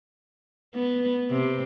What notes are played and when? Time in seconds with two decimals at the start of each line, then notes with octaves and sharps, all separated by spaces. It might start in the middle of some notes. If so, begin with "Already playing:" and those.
0.75 B3
1.31 C3